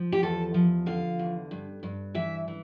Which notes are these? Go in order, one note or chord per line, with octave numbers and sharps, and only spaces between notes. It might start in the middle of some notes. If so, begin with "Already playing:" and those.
Already playing: F3
G4
E2 A4
F3
D3 F5
E2
G2
G2
E3 E5
E3